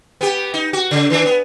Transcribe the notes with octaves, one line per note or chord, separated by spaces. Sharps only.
B3 G4
D#4
F#4
C#3
D#3 E3 D4
B3